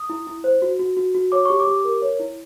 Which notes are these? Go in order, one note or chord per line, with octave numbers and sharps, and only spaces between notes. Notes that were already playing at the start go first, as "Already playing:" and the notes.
Already playing: D#6
E4
E4
C5
F#4
F#4
F#4
F#4
C#5 D6
G4 C#6
D6
G4
A#4
C#5
E4